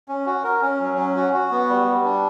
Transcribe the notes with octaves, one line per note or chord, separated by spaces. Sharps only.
C#4
F#4
A#4
C#4
F#3
C#4
F#4
F#4
B3
G3
G3
D4